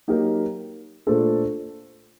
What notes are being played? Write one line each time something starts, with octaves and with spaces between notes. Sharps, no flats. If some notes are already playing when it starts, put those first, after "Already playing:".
F#3 A#3 D#4 G4 A#4
A#2 A3 D4 A4 C5